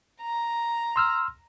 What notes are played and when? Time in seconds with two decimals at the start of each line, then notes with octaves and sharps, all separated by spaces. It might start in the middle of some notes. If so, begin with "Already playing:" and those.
0.22 A#5
0.96 C6 E6 F6